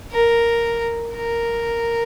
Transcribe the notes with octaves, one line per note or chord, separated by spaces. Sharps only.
A#4
A#4